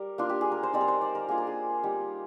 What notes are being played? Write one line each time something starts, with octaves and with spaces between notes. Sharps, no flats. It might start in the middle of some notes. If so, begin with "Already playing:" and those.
Already playing: G3 A#4
A#3 D4 F4
G4
G#4
A#4
C5
G3 C4 D#4 D5
A#4
C5
D5
A#4
A#3 D4 F4 G#4
A#4
G#4
G3 C4 D#4